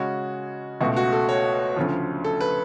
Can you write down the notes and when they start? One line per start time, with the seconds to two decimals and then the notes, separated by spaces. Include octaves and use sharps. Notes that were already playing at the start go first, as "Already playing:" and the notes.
Already playing: C#3 G#3 C#4 F#4
0.81 C#2 B2 A3 F#4
0.97 F#4
1.13 A4
1.29 C#5
1.76 D2 C#3 F3
2.24 A4
2.41 B4